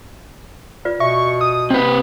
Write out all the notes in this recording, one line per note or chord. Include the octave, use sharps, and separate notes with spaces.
F4 B4 D5
B2 E5 C#6
D#6
C3 C4 B4